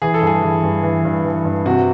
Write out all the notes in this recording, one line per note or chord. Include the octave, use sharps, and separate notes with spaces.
E3 G#4
A4
G2
G#4
E3
G2
E3
G2
E3
G2
C3 F#4